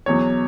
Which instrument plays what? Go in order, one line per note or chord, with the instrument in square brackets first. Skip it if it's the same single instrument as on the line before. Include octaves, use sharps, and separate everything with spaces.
[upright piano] E2 B2 F#3 C#5